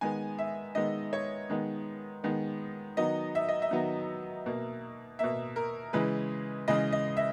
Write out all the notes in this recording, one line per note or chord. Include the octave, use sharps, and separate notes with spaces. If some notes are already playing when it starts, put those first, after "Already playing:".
D#3 G#3 B3 G#5
E5
D#3 G#3 B3 D#5
C#5
D#3 G#3 B3
D#3 G#3 B3
D#3 F#3 B3 D#5
E5
D#5
E5
D#3 F#3 B3
B2 A#3
B2 A#3 E5
A#4
C#3 E3 G#3 B4
C#3 E3 G#3 D#5
D#5
E5